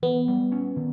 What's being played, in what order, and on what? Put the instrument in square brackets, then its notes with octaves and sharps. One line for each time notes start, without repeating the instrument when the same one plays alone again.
[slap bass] E3 [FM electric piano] B3
[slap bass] G3
C#4
D#3